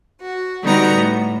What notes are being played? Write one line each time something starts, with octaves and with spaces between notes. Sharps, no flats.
F#4
D3 G3 B3 D#4 F#4 A#5
A2